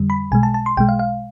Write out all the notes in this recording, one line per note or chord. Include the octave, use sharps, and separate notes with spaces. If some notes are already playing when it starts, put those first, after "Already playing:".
Already playing: F2 D3 G3
B5
B1 B2 G#3 G#5
A5
A5
C6
B1 B2 G#3 G5
F5
F5